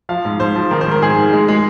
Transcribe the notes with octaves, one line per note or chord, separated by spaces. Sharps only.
F3 F5
G#2
G#2 C5
F3
D#3 A#4
C5
G#2
A#4
G#2 G#4
G#2
G#3
G#3